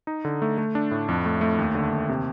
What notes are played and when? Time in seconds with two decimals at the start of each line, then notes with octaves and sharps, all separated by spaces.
0.07 D#4
0.25 D3
0.42 A3
0.58 A3
0.75 D4
0.91 A2
1.09 F2
1.26 A3
1.41 A3
1.58 D#2
1.75 D3
1.91 D#2
2.09 C3